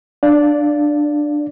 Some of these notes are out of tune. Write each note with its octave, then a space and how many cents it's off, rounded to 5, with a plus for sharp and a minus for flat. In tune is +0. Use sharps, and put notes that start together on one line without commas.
D4 +15 D5 -10 F5 +0